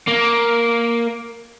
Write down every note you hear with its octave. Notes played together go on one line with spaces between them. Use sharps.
A#3